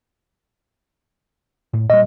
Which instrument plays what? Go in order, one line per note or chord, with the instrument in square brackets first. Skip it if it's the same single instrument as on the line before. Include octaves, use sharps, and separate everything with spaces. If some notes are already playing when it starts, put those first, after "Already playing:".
[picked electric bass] A2
[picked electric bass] A#2 G3 [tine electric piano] D#5